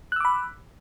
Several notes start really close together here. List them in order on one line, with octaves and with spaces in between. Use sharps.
F#6 E6 D6 B5